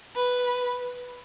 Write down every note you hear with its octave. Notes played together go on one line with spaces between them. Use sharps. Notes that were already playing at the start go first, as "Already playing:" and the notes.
B4